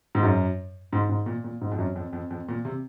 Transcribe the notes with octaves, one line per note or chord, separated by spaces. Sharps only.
G#2
F#2
G#2
G#2
A#2
A#2
G#2
F2
F#2
F2
F2
F2
A#2
C3